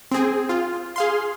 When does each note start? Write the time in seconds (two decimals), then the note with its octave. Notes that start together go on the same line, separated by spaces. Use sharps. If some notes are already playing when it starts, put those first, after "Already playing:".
0.11 C4 G#4
0.49 F4
0.96 G#4 F5 C6